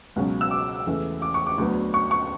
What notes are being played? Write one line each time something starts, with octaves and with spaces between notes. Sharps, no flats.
C#2 B2 F#3 C#4
E6
D6
E2 C#3 E3 A3
D6
C#6
D6
D2 D3 F#3 B3
C#6
C#6